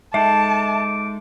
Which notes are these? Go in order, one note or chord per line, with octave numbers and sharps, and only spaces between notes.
G#3 D#4 A4 E5 A5 D6